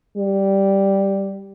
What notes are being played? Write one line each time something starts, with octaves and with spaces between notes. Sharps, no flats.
G3